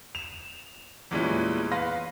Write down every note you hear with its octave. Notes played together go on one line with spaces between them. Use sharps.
E7 F7
E2 A#2 E3 G3 G#3 C#4
B4 F5 C6 A#6